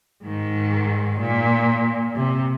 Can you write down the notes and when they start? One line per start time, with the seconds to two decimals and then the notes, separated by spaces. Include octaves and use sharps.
0.23 G#2 D#3
1.20 A#2
2.15 C3